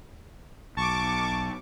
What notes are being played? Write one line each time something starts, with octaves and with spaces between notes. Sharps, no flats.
B1 A5 C#6 D6